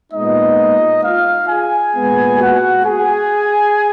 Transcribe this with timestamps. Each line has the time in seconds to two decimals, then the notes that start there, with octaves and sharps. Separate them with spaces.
0.12 A#2 G#3 B3 D#4 D#5
1.03 F4 F5
1.48 G#4 G#5
1.94 A#2 G#3 B3
2.40 F#4 F#5
2.85 G#4 G#5